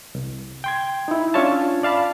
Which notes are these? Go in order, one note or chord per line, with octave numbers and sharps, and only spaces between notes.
C2
G5 C6 G#6
D#4 E4
C#4 D4 F4 C#5 E5 A5
D5 F5 A5 B5